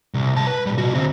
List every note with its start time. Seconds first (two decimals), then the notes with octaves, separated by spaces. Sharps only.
0.14 C2
0.35 C2 A5
0.47 B4
0.66 A#2 G3
0.78 C3 F#4
0.94 D2 C4